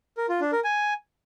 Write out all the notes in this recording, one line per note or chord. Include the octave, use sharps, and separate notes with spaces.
A#4
F4
D4
A#4
G#5